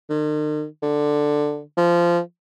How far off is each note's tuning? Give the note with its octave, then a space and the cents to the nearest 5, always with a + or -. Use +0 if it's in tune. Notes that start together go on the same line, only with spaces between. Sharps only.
D#3 -45
D3 +10
F3 -15